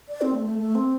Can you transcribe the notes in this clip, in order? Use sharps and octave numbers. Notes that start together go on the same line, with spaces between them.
D5
C4
A3
A3
A3
C4